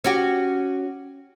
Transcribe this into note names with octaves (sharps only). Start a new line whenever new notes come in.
C#4 F#4 G4